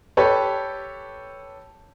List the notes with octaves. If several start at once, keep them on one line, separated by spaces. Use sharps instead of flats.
G4 A4 B4 C#5